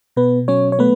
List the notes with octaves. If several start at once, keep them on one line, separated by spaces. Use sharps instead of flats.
B2 B3 B4
F#3 C#4 C#5
C#5
A3 B3 B4